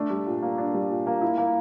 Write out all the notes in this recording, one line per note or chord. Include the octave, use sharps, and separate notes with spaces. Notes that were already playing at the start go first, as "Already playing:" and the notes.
Already playing: A3 D4
G3
A#2
A#3
D4
G3
A#2
A#3
E4
A#3